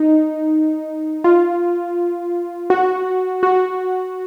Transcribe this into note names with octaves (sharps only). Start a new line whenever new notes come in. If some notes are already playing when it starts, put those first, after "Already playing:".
Already playing: D#4
F4
F#4
F#4